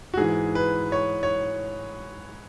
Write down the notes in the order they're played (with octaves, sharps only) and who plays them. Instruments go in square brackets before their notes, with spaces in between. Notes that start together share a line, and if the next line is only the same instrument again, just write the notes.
[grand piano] F#4
G#2 E3 G#4
B4
C#5
C#5